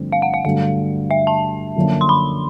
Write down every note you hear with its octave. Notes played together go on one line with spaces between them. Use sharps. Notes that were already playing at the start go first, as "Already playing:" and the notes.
Already playing: G2 D3 F3 A3 C4
F5
F#5
F5
G2 D3 F#3 A3 F5
E5
A5
F#2 D3 F3 A#3 C#4
C6
B5